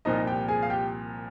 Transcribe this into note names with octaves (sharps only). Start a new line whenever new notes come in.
C2 A#2 F3 D#4 D#5
G4 G5
G#4 G#5
F5
G4 G5